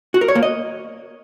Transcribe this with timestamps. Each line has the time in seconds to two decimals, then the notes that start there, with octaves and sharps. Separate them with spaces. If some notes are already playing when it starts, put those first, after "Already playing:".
0.14 F#4
0.21 A#4
0.28 C#5
0.35 A#3
0.43 D#5